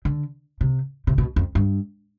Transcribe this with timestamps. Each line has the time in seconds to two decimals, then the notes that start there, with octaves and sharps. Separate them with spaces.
0.05 D3
0.61 C3
1.07 C3
1.18 B2
1.36 F2
1.55 G2